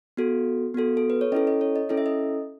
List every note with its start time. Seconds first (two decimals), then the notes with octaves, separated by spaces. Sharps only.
0.17 B3 F#4 A4
0.74 B3 F#4 A4
0.97 A4
1.10 B4
1.21 C#5
1.32 C#4 E4 A4 D#5
1.47 D#5
1.61 C#5
1.76 D#5
1.89 C#4 E4 A4 D#5
1.97 E5
2.06 D#5